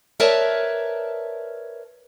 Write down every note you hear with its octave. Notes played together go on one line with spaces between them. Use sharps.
A#4 B4 C#5 D5 E5 A5